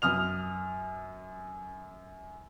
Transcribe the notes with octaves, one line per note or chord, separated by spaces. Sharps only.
F#2 D#6 F6 F7